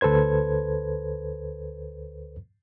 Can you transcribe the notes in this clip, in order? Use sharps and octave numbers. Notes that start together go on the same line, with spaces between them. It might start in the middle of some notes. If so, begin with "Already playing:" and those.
D2 A4 B4 C5 G#6